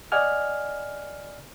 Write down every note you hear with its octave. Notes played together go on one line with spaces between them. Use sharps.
D5 D#5 F#5 G#5 F6